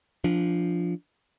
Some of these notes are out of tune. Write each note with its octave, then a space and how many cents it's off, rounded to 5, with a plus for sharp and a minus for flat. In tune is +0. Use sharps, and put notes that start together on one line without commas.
F3 +0 D4 +0